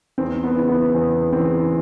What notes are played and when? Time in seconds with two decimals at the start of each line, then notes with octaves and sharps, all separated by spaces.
0.18 E2 C4
0.44 B3
0.56 C#3 E3
0.68 B3
0.94 E2
1.32 C#3 E3 C4